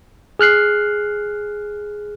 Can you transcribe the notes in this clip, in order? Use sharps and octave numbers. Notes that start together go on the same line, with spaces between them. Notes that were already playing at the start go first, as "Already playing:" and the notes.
G#4 F6 F#6 C7